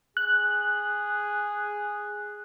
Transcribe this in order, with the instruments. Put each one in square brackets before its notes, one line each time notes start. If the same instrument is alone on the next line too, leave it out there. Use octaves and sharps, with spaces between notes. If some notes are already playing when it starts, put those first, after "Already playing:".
[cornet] G#4 [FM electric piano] F#6